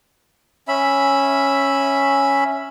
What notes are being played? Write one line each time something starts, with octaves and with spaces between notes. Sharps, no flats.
C#4 E5 B5